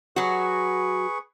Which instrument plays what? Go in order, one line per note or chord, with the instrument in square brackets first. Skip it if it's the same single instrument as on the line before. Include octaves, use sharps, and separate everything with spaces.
[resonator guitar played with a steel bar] F#3 F#4 [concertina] G#4 B4 C#6